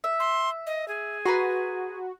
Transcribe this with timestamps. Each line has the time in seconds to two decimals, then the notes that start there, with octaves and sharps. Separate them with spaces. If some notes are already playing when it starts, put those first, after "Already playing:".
0.04 E5
0.20 C6
0.67 D#5
0.88 G#4
1.26 F#4 B4 A#5 C6